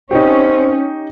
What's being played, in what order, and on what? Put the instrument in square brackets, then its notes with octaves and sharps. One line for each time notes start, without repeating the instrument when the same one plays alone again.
[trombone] C4 [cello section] C#4 [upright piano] D#4 G4